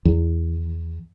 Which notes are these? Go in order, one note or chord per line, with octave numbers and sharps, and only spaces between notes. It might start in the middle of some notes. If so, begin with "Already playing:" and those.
E2